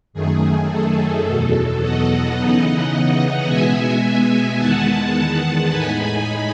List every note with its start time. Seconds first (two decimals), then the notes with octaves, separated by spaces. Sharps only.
0.13 F#2 D#3 A3 G#4
0.69 A4
1.25 E2 B2 F#3
1.80 D#5 F#5
2.36 C#3 E3 B3 D#4
3.47 B2 G#3 B3 E5 G#5
4.58 E2 D#3 G#3 B3 F#5 A5
5.70 A2 G#3 D#4 G#5 B5